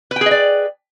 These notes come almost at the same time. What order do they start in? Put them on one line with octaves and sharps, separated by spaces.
B4 G5 G#4 D#5 D5